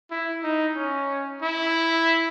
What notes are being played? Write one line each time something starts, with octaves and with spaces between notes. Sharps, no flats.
E4
D#4
C#4
E4